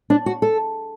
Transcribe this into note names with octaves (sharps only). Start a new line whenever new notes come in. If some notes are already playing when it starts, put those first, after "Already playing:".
D4
F#4
A4